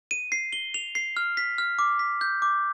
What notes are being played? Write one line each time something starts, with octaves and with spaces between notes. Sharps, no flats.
D#7
C7
G7
F7
C7
F6
B6
F6
D6
B6
G6
D6